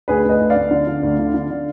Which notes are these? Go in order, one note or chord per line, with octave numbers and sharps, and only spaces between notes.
D2 G#4 B4
D2 B4 D#5
D2
D5 F5
D2
D3
D3
D2
D3
D3
D3